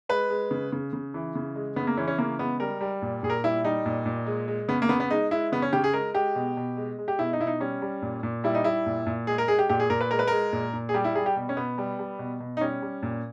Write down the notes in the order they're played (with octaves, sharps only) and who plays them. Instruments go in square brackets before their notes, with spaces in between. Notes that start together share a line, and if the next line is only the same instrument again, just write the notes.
[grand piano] G#3 B4
G#3
C#3
C#3
C#3
E3
C#3
G#3
C#3 B3
A#3
E3 C#4
C#4
C#3 A#3
G#3 B3
G3 A#4
G3
A#2
A#2 G#4
A#4
G3 E4
G3 D#4
A#2
A#2
G#3
G#3
C#3 B3
A#3
C#3 B3
B3
G#3 D#4
G#3 E4
C#3 B3
C#4
C#3 G4
G#4
G#3 A#4
G#3 G4
B2
B2
G#3
G#3
G4
B2 E4
D#4
B2 E4
D#4
G3 C#4
G3
A#2
A#2
G3 E4
D#4
G3 E4
A#2
A#2
G#3 G#4
A#4
G#3 G#4
G4
A#2 G4
G#4
A#2 A#4
B4
G#3 A#4
B4
G#3 A#4
A#2
A#2
G#4
G3 G4
E4
G3 G#4
G4
B2
C#4
B2 B3
G3
G3
B2
B2
D#4
G3 C#4
G3
A#2